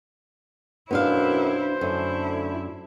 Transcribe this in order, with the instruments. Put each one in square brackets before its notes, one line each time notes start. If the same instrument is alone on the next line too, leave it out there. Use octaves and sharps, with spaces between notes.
[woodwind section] F#2 B2 [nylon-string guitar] B3 D4 F5 [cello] E4 [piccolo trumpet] C5
[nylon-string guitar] F#2 [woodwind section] D3 A3 [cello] E4